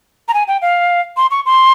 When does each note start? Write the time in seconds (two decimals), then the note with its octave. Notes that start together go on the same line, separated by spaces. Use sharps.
0.28 A#5
0.34 G#5
0.48 G5
0.62 F5
1.17 C6
1.31 C#6
1.46 C6